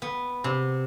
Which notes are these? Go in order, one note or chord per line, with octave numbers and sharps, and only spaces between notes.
B3
C3